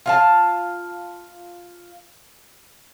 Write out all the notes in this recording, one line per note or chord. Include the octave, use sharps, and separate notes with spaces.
F4 F5 A5